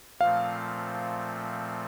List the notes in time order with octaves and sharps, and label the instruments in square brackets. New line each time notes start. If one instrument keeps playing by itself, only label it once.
[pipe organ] A#2 F3 A3 C4 [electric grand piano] F5